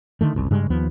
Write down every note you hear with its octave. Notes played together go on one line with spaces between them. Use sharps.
D3 D#3 A3
F#1 C2
G2 C#3 G3 G#3
D#2 F3 B3